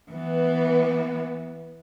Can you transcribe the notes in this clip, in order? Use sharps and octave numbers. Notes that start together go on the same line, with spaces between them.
E3 B3